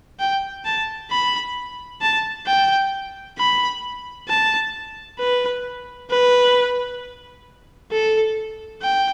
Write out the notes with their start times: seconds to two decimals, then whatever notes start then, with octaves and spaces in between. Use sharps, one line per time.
0.20 G5
0.65 A5
1.11 B5
2.02 A5
2.47 G5
3.38 B5
4.29 A5
5.19 B4
6.10 B4
7.92 A4
8.82 G5